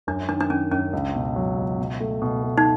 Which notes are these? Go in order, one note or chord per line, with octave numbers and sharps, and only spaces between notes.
F#2 D4
D#3 D4
D4
D#3 C#4
F#2 C#4
C#2
B2
F#3
C#2
B2
A3
B2
A3
D#4